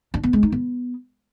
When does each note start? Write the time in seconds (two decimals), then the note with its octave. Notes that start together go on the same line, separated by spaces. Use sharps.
0.14 D4
0.23 B3
0.33 G#3
0.43 D#4
0.52 B3